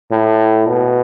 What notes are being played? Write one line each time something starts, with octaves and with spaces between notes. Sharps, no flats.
A2
B2